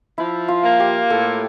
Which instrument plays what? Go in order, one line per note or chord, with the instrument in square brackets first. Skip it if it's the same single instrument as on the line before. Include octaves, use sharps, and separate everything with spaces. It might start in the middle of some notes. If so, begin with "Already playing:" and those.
[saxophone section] F3 [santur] E4
[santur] F4
[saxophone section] A#3
[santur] G4
[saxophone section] A2 [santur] A4